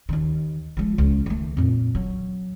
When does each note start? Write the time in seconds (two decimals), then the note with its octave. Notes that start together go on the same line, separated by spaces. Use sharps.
0.09 D#2 D#3
0.77 F3 G#3
0.98 C#2
1.26 D#3 A3
1.57 F2 A#2
1.95 F#3